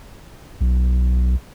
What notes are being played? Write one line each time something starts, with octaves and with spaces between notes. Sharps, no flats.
B1